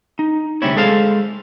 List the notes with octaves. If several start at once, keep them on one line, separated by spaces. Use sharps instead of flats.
D#4
D2 C3 G3 C#4 E4 C#5
G#3 G#4 A4 C5 F5